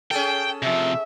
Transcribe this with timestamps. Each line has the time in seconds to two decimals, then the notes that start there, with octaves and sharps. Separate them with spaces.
0.11 C#4 G#4 A4 G5
0.62 C3 F3 E5